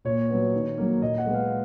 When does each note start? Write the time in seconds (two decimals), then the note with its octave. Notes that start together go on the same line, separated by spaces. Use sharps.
0.05 A#2 C#5
0.29 F#3 B3
0.54 D#3
0.78 F#3 A#3
1.01 A#2 D#5
1.18 F#5
1.26 G#3 B3
1.34 F5